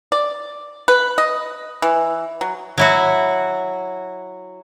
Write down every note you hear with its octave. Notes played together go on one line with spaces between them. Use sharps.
D5
B4
D#5
E3
F#3
F#3 E4 F#4